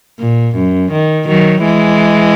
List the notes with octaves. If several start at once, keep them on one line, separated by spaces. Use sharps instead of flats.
A#2
F#2
D#3
D#3 F#3
E3 G#3